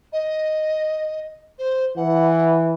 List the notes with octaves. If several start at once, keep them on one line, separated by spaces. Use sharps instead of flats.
D#5
C5
E3 F#5